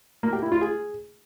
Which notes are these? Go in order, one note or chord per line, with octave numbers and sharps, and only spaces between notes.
A#3
G4
E4
F4
G#4